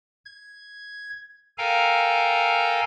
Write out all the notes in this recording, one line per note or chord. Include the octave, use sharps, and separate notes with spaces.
G#6
A4 A#4 F5 G5 G#5 A#5